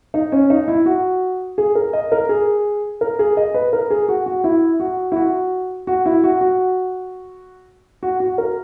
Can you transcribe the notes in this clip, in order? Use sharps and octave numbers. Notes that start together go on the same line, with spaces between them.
D#4
C#4
D#4
E4
F#4
G#4
A#4
D#5
A#4
G#4
A#4
G#4
D#5
B4
A#4
G#4
F#4
F#4
E4
F#4
E4
F#4
F#4
E4
F#4
F#4
F#4
F#4
A#4